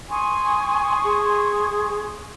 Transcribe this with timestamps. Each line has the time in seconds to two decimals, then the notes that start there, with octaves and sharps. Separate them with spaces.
0.09 G#5 C6 C#6 D#6
1.04 G#4